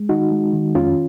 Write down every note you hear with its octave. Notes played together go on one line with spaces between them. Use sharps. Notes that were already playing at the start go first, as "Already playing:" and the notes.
Already playing: G#3
D#3 D#4 F#4
G#3
D#3
F2 C#4 F4